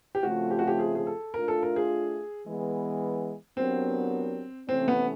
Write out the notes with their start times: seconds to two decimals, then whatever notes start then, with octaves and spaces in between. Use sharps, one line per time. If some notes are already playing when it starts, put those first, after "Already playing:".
0.15 G4
0.23 C#3 F3 A3 C4 F4 F#4
0.51 G4
0.59 F#4
0.67 G4
0.79 G#4
0.95 G#4
1.07 A4
1.34 A3 D4 F4 A#4
1.48 A4
1.63 A#4
1.76 G#4
2.45 E3 G#3 B3
3.57 F#3 B3 C4 D4 G4 A#4
4.69 C3 E3 A3 C4 C#4
4.88 B3